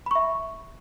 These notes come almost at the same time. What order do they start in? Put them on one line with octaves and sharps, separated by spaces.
B5 C#6 E5